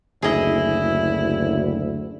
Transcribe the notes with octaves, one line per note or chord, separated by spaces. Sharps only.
F#1 D2 E4 G#4 D#5